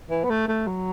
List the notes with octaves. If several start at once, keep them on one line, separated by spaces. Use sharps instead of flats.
E3
B3
A3
A3
F#3